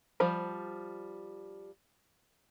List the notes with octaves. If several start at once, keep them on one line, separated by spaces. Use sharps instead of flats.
F3 G3 C5